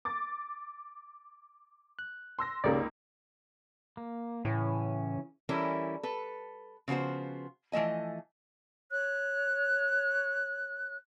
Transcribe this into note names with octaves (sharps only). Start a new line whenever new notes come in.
D6 A6
F#6
C6 E6 A#6
C#2 C#3 A#3 D#4 G4 D5
A#3
A2 C#3 E3 C#4
E3 G3 C#4 E4 A4 A#4
A4 B4
C#3 F3 B3 F#4 C5
E3 F3 A3 D#5 G#5
C#5 F#6